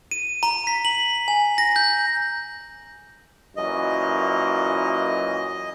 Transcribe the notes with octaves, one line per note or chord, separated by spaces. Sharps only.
D#7
A#5
B6
F#7
G#5
A#6
G6
F#2 A#2 E3 D#5